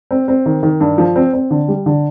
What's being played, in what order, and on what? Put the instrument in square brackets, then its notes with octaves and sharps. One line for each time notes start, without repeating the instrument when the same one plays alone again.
[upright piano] C4
C4
D#3
D#3
G2
F3
C4
C4
D3
G3
D3